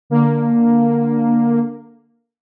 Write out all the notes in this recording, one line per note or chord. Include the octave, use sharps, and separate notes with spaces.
D3 A#3